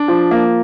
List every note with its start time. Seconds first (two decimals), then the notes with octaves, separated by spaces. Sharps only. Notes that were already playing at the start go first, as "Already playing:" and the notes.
Already playing: D4
0.08 F3
0.31 A#3